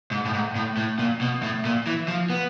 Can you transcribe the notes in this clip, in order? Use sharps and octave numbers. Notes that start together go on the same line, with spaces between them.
G#2
A2
G#2
A2
A2
A#2
B2
A2
A#2
E3
F3
B3